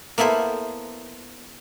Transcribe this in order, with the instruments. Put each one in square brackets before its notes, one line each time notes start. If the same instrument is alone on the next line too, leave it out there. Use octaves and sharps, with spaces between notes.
[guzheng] A#3 B3 E4 A4 C5